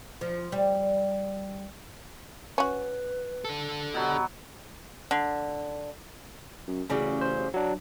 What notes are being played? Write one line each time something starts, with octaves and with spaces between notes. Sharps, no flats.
F3
G3
C#4 F#4 B4
D4 A4
B2 F#3 G4
D3
F#2
A1 C#3 F#3 G3
C5
F#3 D4